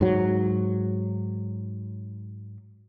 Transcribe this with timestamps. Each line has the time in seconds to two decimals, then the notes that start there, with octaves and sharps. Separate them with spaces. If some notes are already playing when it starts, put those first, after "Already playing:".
0.01 G#2 F#3